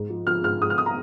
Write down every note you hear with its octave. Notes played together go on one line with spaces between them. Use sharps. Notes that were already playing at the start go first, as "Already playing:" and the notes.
Already playing: G#2
F3
F3 F6
G#2 F6
G#2 D#6
F6
D#6
A#5